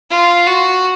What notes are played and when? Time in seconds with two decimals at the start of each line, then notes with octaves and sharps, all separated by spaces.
0.10 F4
0.47 F#4